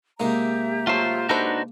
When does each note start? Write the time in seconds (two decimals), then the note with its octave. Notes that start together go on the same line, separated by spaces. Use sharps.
0.20 C3 G#3 A#3 D#4 G4 E5 A#5
0.87 F#3 A3 F4 C5
1.29 D4 D#4 F#4 A4 B4 C5